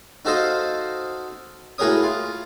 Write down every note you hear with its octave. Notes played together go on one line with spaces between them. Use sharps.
D#4 F#4 A4 C5 D#5 F5
A2 F#4 G#4 A#4 C#5 D#6
F4